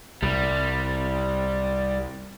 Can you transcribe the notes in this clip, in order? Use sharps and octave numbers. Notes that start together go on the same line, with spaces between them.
C2 G3